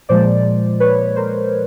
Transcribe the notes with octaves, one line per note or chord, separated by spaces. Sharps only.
A#2 F3 G#3 C5 D5
B4 C#5
A#4 C5